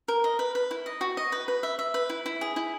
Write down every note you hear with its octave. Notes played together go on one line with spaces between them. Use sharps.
A#4
D#5
B4
B4
E4
D#5
F#4
D#5
B4
B4
E5
E5
B4
E4
E4
G#4
E4